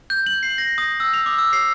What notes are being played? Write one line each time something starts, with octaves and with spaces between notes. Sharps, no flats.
G6
F#7
C7
A#6
D#6
E6
F7
D6
E6
C7